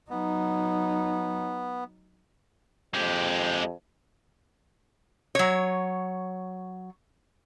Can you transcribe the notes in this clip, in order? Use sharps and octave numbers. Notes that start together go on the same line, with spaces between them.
F#3 B3 D#4
F2 G#3 G4
F#3 C#5